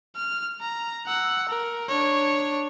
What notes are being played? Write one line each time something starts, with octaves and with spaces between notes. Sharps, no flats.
F6
A#5
F#5 E6
A#4
D4 C#5